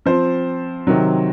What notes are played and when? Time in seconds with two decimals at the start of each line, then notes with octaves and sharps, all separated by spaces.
0.06 F3 C4 C5
0.87 C3 D#3 F#3